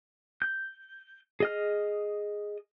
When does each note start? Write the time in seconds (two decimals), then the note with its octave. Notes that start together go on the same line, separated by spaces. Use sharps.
0.42 G6
1.40 G#4 D#5 F6